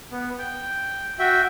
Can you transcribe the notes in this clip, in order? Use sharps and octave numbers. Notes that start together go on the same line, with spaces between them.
B3
G5
F#4 E5 G5